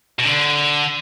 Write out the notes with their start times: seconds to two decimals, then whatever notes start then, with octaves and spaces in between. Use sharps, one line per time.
0.19 B2
0.25 D3